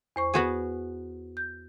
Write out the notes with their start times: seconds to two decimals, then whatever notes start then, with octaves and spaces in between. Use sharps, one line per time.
0.16 E2 C5 C#6
0.34 B3 F#4 G#4
1.37 G6